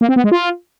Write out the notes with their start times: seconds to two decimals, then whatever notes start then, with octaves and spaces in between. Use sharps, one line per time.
0.01 A#3
0.09 C4
0.16 B3
0.24 G#3
0.32 F4